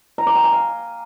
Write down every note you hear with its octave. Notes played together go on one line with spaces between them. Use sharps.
A#5
D6
G5
G#5
F5